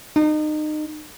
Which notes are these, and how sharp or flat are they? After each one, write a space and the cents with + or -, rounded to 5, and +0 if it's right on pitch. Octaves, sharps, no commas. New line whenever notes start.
D#4 -30